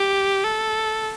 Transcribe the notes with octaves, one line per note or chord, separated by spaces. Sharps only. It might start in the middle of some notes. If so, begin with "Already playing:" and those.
Already playing: G4
A4